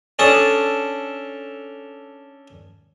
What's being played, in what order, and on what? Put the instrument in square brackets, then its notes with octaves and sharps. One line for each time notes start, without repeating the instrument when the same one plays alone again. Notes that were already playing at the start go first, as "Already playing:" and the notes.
[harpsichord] C#4 D4 A4 A5 D#6